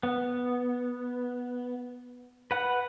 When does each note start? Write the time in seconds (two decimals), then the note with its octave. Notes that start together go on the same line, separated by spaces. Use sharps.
0.03 B3
2.51 B4 F#5